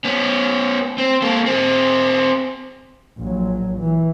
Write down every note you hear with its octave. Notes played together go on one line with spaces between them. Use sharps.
B3 C#4
C4
A#3 A4
C4 G#4
A#1 F#3
E3